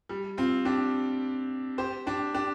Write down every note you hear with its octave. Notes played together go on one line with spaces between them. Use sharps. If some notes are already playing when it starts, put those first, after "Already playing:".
G3
C4 F4
D4 G4
G4 C5
D4 G4
D4 G4